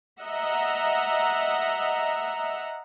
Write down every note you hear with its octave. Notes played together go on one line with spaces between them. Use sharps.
D#5 E5 F#5 A#5